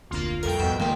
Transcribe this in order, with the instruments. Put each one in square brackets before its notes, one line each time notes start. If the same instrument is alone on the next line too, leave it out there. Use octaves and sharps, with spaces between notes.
[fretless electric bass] F1 D2 A#2 [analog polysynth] A#3 F4
[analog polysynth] C2 F2 G5 [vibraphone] A4 [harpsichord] A#4
[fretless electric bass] E2 G#2 [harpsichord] B2
[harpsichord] C#2 A#2 [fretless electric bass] F#2 G#3 A#3 [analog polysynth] D#3 [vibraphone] G5